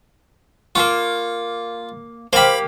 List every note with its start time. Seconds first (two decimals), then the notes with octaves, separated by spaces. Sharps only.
0.75 A#3 B3 F4 C#6
2.33 A#3 F#4 G4 C5 F5 G5 B5